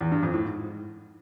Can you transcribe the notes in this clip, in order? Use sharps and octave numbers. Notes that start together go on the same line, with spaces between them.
E2
G2
F2
A2
G#2